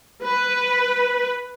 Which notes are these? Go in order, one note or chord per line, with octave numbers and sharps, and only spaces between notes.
B4